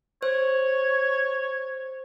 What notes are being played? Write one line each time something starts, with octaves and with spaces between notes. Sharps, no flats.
C5 C#5